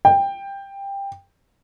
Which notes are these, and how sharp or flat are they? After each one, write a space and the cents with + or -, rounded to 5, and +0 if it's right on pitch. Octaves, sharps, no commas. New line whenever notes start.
G5 +15